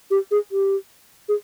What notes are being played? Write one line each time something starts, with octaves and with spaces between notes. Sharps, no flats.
G4
G#4
G4
G#4